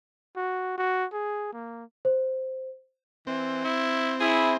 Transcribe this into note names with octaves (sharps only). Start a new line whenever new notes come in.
F#4
F#4
G#4
A#3
C5
E3 C4
E4
E4 G#4